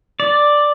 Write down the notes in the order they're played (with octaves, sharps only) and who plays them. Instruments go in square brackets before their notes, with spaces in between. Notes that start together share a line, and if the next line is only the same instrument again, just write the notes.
[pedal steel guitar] D5